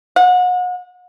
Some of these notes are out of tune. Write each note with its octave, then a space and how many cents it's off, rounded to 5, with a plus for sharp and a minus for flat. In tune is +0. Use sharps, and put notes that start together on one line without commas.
F#5 -35